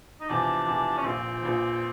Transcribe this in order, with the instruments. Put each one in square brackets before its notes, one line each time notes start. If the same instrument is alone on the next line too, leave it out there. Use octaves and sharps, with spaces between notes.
[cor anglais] D#4
[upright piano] E2 C3 F3 [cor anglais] D4
[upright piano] E2 C3 F3
[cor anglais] C#4
[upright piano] A#1 A#2 F3 [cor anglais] C4
[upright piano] A#1 A#2 F3